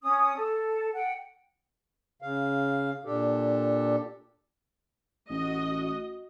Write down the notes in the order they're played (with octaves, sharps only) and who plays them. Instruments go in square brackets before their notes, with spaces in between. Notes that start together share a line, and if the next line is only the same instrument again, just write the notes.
[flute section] C#4 D#6
A4
F#5 G5
[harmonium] C#3 F5
A#2 D4 G4 A4
[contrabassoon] A1 [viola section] F#4 D#5